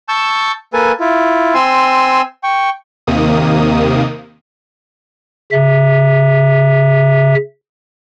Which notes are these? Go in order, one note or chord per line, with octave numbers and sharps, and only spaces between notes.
A5 C#6 E6 G6
A#3 A4 B4 G#5
E4 F4
C4 G#5 C6 E6
G5 C#6
D#2 C3 D#3 A#3 D#6
C#3 E5